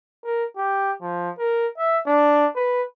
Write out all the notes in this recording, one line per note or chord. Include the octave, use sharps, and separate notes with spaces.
A#4
G4
F3
A#4
E5
D4
B4